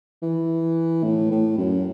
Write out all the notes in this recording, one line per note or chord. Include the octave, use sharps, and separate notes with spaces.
E3
A2
A2
F#2